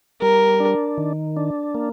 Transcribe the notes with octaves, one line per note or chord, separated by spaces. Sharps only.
G3 A#4
D4
D#3
D4
A#3